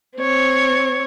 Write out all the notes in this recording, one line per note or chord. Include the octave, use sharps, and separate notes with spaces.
C4 C#5